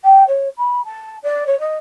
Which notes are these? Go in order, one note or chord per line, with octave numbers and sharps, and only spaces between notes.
G5
C#5
B5
A5
D5
C#5
D#5